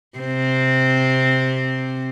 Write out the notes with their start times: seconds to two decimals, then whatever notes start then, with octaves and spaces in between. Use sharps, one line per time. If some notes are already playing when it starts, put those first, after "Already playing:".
0.18 C3 C4